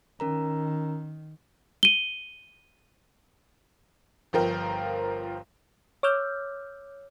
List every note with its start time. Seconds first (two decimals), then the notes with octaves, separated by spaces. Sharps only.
0.20 D#3 C#4 A#4 A#5
1.83 D#7 G7
4.33 G1 F3 A#4 G5
6.03 C#5 D6 E6 F6 G6